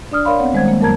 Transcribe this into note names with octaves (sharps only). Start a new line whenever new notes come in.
D4 D5 D#6 F6
A#4 C#5 D5 F5 B5 C6
B3 C4 C#5 F#5
D#3 G3 G#3 C5 F#5 G#6
A#3
F2 F#3 A#4 A5 A#5 G#6